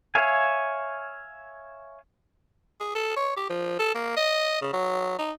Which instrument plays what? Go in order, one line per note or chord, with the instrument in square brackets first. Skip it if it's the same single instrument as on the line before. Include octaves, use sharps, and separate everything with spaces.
[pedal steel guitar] C#5 E5 F5 G#5
[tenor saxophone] G#4
A4
C#5
G4
F3
A4
A#3
D#5
C#3
F#3
D#4